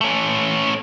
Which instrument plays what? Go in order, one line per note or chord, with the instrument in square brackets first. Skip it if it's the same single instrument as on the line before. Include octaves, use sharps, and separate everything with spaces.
[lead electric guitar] A3 C#4